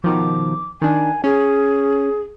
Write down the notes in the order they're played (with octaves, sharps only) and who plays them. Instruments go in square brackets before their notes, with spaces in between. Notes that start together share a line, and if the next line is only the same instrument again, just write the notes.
[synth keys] B2 D#3 F3 [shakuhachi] D6
[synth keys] D#3 D4 [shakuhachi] G#5
[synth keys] C#4 [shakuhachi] G#4